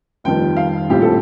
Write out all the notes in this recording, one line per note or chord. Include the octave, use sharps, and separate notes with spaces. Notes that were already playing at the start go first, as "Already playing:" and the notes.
F1 F2 D#3 G3 G5
F5
A#1 A2 G3 C4 G4
A4